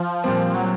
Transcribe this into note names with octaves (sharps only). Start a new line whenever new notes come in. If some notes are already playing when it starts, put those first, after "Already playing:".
Already playing: F3
A#2 G3 C4
F#3